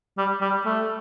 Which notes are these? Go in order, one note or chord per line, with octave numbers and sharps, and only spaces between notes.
G3
G3
A3